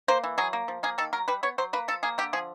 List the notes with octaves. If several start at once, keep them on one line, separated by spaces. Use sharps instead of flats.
A#3 C5
E3
F#3 G#4
A#3
F3
A#3 G#4
D#3 A4
F#3 A#4
G3 B4
B3 C#5
F#3 C5
A#3 B4
F3 A4
A#3 G#4
D3 G4
F3 G#4